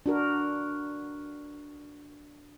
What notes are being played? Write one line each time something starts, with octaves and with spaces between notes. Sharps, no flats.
D4 F#4 A#4